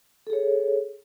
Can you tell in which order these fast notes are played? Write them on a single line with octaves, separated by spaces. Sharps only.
A4 G#4 C#5